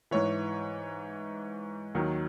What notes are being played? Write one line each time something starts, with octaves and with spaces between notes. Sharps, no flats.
G#2 E3 C#5
D#2 D#3 F#3